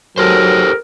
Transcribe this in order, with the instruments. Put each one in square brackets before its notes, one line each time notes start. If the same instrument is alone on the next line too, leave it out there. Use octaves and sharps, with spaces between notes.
[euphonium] F#3 [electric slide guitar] G4 A4 C5 [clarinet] A#4